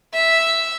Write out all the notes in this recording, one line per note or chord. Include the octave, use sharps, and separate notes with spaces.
E5